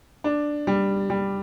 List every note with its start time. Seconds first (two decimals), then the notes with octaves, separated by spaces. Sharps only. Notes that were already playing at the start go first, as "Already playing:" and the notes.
0.24 D4
0.67 G3
1.10 G3